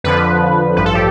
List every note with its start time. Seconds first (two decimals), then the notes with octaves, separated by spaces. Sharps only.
0.04 F2 D3 F3 B4
0.77 A1 G2 F3 B4
0.86 A4
0.95 G4